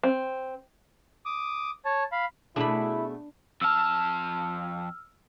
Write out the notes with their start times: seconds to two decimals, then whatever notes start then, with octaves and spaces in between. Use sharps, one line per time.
0.03 C4
1.26 D6 D#6
1.85 C#5 A5
2.12 F5 B5
2.56 B2 A3 D4 E4 G#4 B5
3.61 F2 A5 E6 F6